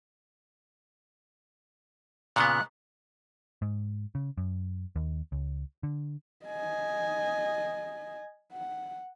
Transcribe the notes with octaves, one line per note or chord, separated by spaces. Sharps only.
A#2 C#3 B3 F#6
G#2
C#3
F#2
D#2
C#2
D3
D#5 G#5
F#5